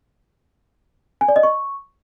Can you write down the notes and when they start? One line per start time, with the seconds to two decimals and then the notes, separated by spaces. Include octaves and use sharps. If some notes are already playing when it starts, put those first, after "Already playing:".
1.21 G#5
1.28 D5
1.36 D#5
1.43 C#6